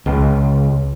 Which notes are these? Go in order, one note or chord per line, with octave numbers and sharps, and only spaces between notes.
C#2